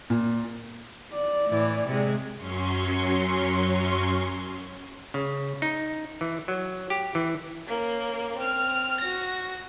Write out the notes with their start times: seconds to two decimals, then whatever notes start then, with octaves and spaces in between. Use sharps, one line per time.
0.10 A#2
1.12 D5
1.48 A2 E3
1.86 C3 G#3
2.36 F#2 F#3 C#4 C6 C#6
5.14 C#3
5.62 D#4
6.21 E3
6.48 F#3
6.90 G4
7.15 E3
7.67 A#3 C#4
8.37 C4 F6
9.01 F#4 A#6